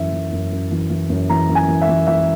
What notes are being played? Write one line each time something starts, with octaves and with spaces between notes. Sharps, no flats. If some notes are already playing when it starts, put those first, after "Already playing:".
Already playing: F#2 E3 E5
E3
F#2
F#2
E3
E3
F#2
E3 A#5
F#2
G#5
E3
E5
E3
E3 E5